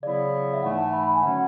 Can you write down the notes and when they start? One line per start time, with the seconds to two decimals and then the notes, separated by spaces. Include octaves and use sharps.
0.03 C#3 F#3 B3 E4 D5
0.54 E5
0.63 G#2 E3 A3 F#5
0.78 A5
0.93 B5
1.03 B5
1.13 G#5
1.23 D3 F#3 C#4 F#4 F#5